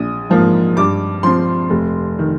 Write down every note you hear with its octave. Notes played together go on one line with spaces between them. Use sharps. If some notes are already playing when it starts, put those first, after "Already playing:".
Already playing: A#1 D#6
G#2 F3 A#3
G2 D6
F3 C4 C6
F1
D#3